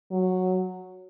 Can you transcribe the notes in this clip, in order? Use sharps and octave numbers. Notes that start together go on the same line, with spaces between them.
F#3